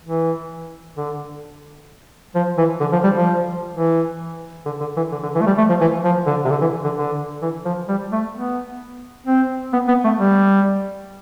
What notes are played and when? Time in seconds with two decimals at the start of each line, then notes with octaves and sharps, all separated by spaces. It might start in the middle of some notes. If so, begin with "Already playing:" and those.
0.04 E3
0.96 D3
2.35 F3
2.58 E3
2.80 D3
2.92 F3
3.04 G3
3.15 F3
3.73 E3
4.66 D3
4.81 D3
4.97 E3
5.12 D3
5.23 D3
5.35 E3
5.41 A3
5.46 G3
5.58 A3
5.69 F3
5.81 E3
6.04 F3
6.26 D3
6.45 C3
6.51 D3
6.62 E3
6.84 D3
6.97 D3
7.42 E3
7.65 F3
7.89 G3
8.12 A3
8.35 B3
9.27 C4
9.73 B3
9.88 B3
10.04 A3
10.19 G3